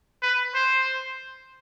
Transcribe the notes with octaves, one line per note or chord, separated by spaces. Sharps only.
B4
C5